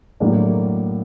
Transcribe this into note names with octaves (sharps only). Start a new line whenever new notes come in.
A2 F#3 A#3 D4